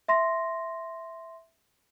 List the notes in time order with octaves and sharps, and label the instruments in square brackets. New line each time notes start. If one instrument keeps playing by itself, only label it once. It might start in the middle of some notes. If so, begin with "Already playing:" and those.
[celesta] E5 C6 A#6